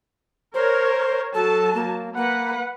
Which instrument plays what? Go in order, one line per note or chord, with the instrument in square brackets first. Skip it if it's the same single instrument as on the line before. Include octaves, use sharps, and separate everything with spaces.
[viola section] A#4 C#5 [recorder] C5
[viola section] F#3 A5 [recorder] A4
[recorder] A#3
[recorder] A#3 [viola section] B4 F#5